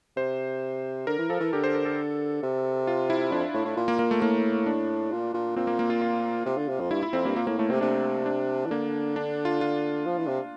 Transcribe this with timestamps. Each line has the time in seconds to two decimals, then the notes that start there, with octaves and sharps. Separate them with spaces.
0.17 C3 C5
1.07 D3 A#4
1.18 E3
1.29 F3 A4
1.40 E3
1.53 D3 G4
1.64 C5
1.75 A#4
1.85 A4
2.43 C3
2.87 F4
3.10 E4
3.32 F2 D4
3.54 A2
3.65 A2
3.76 A#2
3.88 A#3
3.99 A#3
4.11 A3
4.21 A2 A#3
4.66 D4
5.12 A#2
5.34 A#2
5.56 A#2 C4
5.67 A#3
5.79 A#3
5.90 F4
6.02 F4
6.46 C3
6.58 D3
6.69 C3
6.80 F2
6.91 G2 E4
7.03 E4
7.13 F2 C4
7.25 G2 A#3
7.36 A#2 A#3
7.47 A2 A#3
7.58 A2 A3
7.70 C3 C4
7.81 C3 D4
8.26 D4
8.66 E3
8.70 D3 A#3
9.16 D4
9.45 F4
9.61 F4
10.05 F3
10.17 E3
10.27 C3